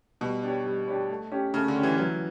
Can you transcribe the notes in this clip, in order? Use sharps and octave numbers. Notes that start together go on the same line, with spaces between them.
B2 G3
D4 G4 C#5
G3
D4 G4 C#5
A3
C#4 G4 C#5
C#3 A3
D3
C#4 G4 C#5
E3
E3 F#3